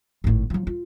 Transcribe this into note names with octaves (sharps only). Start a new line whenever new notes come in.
G#1 A2
F3 F#3
F4